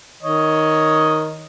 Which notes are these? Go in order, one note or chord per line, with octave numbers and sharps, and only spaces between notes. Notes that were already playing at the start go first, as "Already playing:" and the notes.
D#3 C#5 D#5